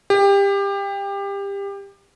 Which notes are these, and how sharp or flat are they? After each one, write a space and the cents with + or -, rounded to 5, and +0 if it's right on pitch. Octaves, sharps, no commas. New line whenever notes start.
G4 +25